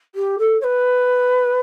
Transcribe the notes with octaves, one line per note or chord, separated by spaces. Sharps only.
G4
A4
C#5
B4